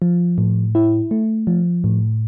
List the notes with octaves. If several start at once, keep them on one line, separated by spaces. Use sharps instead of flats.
F3
A2
E4
A3
F3
A2